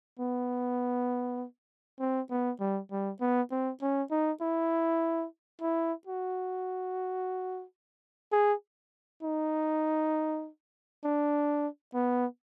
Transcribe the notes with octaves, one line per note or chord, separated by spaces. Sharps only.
B3
C4
B3
G3
G3
B3
C4
C#4
D#4
E4
E4
F#4
G#4
D#4
D4
B3